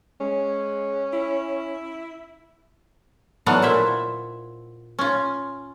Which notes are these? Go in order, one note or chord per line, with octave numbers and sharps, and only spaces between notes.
G#3 C#4
E4
D3 E3 F#3 B3 F5 F#5
A#2 E4 C5 E5
C#4 F4